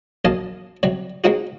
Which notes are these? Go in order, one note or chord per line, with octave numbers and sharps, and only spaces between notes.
A#1 F#2 D#5 F5 G#5 A5
C3 F#3 G3
G#3 B3 C4 D#4 F4 F#4